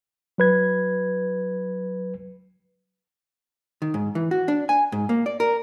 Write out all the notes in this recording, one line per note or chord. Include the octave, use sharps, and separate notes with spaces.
F#3 B4 G#6
D#3
G#2
E3
F#4
D4
G#5
G#2
A#3
D5
A#4